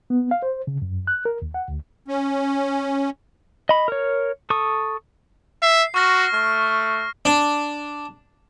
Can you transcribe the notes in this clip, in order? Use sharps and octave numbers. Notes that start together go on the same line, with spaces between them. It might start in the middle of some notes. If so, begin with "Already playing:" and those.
B3
F5
C5
C#3
F#2
F#6
A#4
D#2
F#5
D2
C#4
D#5 B5
A#4 C#5
A4 C#6 D#6
E5 C7
F#4 C#6 F6 A#6
A3 F6
D4